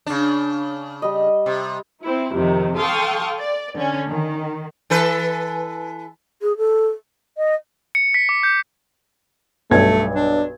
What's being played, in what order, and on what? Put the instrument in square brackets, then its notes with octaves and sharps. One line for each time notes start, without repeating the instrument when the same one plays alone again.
[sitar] C#3 D4
[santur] G3 D#5
[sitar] C3
[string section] C4 E4
F2 C3 D#3
A4 F5 G5 C6 C#6 D#6
D5
D3 C#4
D#3
[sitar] E3 A4 B4
[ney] G#4
A4
[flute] D#5
[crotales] C#7
B6
D6
G6
[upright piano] B1 G2 G#6 [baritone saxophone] A3
[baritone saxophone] D4